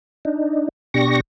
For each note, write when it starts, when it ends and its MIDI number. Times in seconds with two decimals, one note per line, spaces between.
0.25 0.68 62
0.25 0.68 63
0.94 1.20 47
0.94 1.20 62
0.94 1.20 67
0.94 1.20 85
0.94 1.20 94